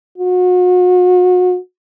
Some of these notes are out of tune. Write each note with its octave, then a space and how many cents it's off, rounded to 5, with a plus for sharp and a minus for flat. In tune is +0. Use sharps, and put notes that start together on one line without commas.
F#4 -35